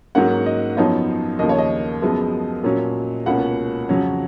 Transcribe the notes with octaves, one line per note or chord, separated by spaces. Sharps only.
G#2 F#3 A#3 C#4 F#5
D#5
F#2 F3 B3 D#4 C#5
D#2 C#3 F3 A#3 D#5
C#5
D#5
F#2 F3 G#3 B3
A#2 F#3 C#4
C#2 B2 A#3 C#4 F#5
F2 C#3 F#3 C#4